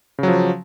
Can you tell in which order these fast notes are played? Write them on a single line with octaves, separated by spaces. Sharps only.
C#3 F#3 F3